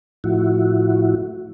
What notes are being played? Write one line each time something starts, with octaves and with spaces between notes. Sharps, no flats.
A2 F3 E4 F#4